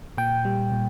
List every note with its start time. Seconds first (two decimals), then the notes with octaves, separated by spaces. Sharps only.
0.18 A#2 G5
0.45 G3
0.72 A#2